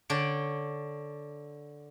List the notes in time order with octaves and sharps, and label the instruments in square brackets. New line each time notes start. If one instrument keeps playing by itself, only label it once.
[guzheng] D3 D4 C#5 G5